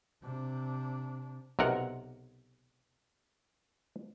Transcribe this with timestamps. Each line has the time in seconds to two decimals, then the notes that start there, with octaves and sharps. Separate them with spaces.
0.22 C3 D4
1.59 B1 C3 A#4 F#5